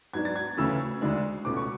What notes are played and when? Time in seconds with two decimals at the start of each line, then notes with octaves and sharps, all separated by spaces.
0.13 G#2 F#3 B3 D4 G#6
0.25 A6
0.36 G#6
0.57 D2 C#3 E3 A3 C#4 E6
1.01 D2 D3 G#3 D4
1.45 C#2 B2 A3 C#4 D6
1.57 C#6